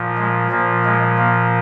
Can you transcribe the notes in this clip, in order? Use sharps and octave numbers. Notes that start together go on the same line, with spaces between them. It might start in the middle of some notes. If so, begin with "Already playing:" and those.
Already playing: A#2 F3
G#3
A#2 F3 A#3
G#3
A#3